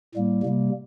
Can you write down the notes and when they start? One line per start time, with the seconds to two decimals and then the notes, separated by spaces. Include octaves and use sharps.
0.15 A2 G3 A#3
0.43 C3 G3 A#3